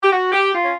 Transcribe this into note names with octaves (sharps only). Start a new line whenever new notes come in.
G4
F#4
G4
F4
C#4